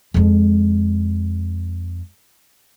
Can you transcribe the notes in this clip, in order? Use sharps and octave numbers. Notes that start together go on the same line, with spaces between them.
F2 G#3